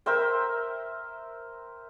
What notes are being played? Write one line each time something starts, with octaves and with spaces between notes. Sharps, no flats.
A#4 C5 E5 G5